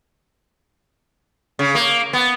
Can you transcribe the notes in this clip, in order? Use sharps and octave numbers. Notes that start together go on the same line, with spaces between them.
C#3
A#3
B3